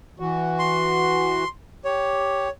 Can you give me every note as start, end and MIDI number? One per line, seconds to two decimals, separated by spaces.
0.20 1.44 52
0.20 1.44 66
0.59 1.48 84
1.85 2.48 67
1.85 2.50 73